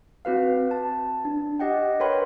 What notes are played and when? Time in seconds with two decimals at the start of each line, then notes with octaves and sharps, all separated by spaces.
0.25 C4 F#4 B4 F5
0.71 A5
1.25 D4
1.59 G4 D#5 F#5 G5
2.00 A#4 B4 C#5 G5 B5 C6